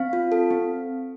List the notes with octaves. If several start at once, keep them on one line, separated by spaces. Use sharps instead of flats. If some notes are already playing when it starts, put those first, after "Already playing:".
Already playing: C4 F5
F4
A4
C4